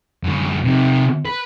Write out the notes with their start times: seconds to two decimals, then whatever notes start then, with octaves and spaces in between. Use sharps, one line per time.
0.24 F#2 D3
0.64 C3 D#4
1.26 B4